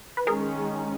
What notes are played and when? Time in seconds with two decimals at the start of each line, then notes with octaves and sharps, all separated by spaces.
0.17 B4
0.27 D#3 G#3 C#4 G#4 A#4